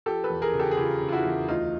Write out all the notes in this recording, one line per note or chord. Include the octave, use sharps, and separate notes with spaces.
F3 G4 A4
A4 B4
E2
G#4 A#4
C#3
G4 A4
G#4
C#3 F4 G4
C#3
F4
E4 F#4
E2
D2 D#4 F4